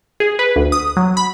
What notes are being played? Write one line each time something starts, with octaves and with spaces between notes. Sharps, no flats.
G#4
B4
D2
D#6
F#3
B5